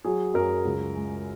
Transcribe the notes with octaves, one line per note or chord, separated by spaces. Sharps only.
F#3 G#4
F#2 A#4
C#2
G#3